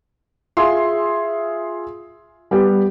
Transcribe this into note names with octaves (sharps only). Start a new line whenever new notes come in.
F4 G#4 E5 C6
G3 B3 G4